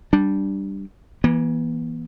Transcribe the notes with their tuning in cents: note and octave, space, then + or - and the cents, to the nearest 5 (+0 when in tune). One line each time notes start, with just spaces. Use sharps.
G3 -5 D4 +0
E3 +0 A#3 +45